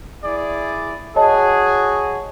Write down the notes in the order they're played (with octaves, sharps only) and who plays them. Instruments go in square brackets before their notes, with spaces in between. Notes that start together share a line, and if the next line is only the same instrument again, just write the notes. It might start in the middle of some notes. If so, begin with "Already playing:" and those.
[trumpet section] E4 G#4 D5
[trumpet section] F#4 G#4 [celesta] C#5 D#5 A5